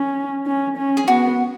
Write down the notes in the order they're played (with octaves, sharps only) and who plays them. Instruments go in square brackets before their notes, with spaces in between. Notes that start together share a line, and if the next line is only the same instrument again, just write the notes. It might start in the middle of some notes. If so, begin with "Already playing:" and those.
Already playing: [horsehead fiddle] C#4
C#4
C#4
[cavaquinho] G#4
[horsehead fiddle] B3 [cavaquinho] F#4